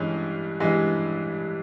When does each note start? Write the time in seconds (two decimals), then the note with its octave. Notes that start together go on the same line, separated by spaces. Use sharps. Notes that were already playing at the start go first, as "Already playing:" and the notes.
Already playing: G2 E3 G#3 C#4
0.60 G2 E3 G#3